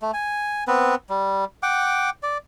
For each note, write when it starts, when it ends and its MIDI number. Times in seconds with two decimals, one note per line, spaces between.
0.02 0.11 57
0.14 0.64 80
0.68 0.95 59
0.68 0.95 60
0.68 0.95 71
1.09 1.45 55
1.63 2.10 78
1.63 2.10 79
1.63 2.10 86
2.23 2.38 74